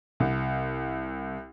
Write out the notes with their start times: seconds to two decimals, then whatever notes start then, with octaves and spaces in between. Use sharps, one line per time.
0.20 C2